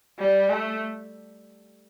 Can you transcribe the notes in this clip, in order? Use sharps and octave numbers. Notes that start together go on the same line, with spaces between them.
G3
A3